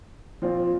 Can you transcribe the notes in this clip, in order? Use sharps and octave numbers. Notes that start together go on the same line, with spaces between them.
A#2 F3 C4 F4